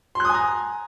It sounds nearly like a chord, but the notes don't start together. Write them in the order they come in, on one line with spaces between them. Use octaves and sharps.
C6 F#6 D#6 G#5 A#5